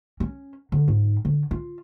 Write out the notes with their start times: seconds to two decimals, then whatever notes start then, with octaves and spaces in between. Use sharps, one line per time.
0.20 C#4
0.72 D3
0.88 G#2
1.25 D3
1.51 F4